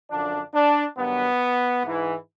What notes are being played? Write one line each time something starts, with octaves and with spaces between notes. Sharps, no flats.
F#2 D3 F3 D4
D4
G2 D#3 F#3 B3
G#2 E3